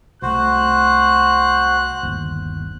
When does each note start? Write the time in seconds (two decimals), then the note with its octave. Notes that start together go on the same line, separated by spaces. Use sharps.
0.22 C2 A3 F#4 C5 F#6
2.03 G1 D#2